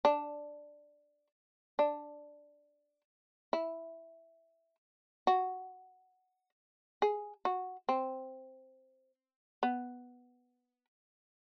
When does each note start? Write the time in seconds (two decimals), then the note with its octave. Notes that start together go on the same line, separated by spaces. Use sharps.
0.05 D4
1.79 D4
3.53 E4
5.27 F#4
7.02 G#4
7.45 F#4
7.89 C4
9.63 B3